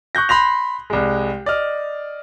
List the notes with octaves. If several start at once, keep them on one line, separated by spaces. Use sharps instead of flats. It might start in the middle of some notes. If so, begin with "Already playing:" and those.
C#6 F#6 G6 A#6
B5 C6 A#6 F7
C2 G#3
D5 D#5 F6